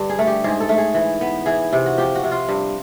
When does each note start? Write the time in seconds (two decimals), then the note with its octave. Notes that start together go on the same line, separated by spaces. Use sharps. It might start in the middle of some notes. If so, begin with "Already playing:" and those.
Already playing: G2 D3
0.09 G#4
0.19 A3
0.27 G4
0.44 G#2 G#4
0.60 A4
0.69 A3
0.78 G#4
0.94 E3
1.21 B3
1.46 E3 G#4
1.73 C3
1.86 F#4
1.97 F3 G4
2.15 F#4
2.23 C3
2.31 F4
2.49 G2